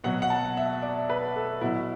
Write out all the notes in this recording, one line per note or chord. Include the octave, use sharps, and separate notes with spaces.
B2 F#3 F#5
F#5
A5
E5
D5
B4
A4
B2 F#3 E4